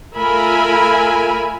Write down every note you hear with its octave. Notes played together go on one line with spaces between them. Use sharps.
A3 F4 A#4 E5 G#5 B5